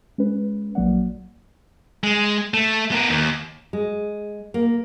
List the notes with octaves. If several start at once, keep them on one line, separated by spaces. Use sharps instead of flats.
G#3 C#4 B4
A#1 F3 F#3 A#3 D5 F#5
G#3
A3
B3 A#4
D#2
G#3
A#3